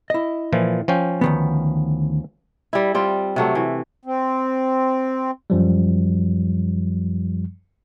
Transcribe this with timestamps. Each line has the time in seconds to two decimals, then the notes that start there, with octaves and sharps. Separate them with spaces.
0.10 E4 D#5
0.53 A#2 E3 F3
0.88 F3 C#4 G5
1.21 D2 D#3 B3
2.73 G3 E4
2.95 G3 C4 F4
3.36 C3 F#3 A3
3.55 E3
4.05 C4
5.50 F#2 F3 G3